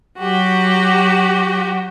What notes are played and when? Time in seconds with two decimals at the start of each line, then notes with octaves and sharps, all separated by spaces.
0.19 F#3 F#4 G4